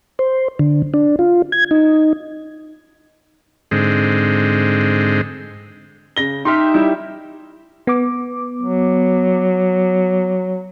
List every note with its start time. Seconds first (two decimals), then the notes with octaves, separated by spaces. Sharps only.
0.19 C5
0.59 D3
0.94 D4
1.19 F4
1.52 G#6
1.71 D#4
3.71 G#2 D3 G#3 C4
6.16 C#3 A#6 G7
6.45 D#4 G4 E5 C6 F6
6.74 G3 E4
7.87 B3 D6
8.62 F#3